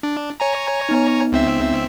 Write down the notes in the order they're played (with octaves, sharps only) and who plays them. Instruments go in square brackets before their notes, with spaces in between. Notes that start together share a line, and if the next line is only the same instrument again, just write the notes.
[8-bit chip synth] D4
C#5 G#5 A#5
[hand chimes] B3 D#4
[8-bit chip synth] C#2 C4 E5